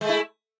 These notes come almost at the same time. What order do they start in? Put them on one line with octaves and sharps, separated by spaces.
G#3 A3 E4